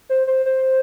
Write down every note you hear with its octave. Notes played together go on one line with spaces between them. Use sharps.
C5
C5
C5